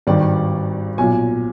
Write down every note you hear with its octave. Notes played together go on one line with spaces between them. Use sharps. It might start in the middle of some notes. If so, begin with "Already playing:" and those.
G#1 G2 D#3 D5
B1 A#2 G#5